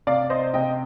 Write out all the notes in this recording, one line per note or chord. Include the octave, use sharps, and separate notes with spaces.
C3 D5 F5
C5 D#5
C3 D#5 G5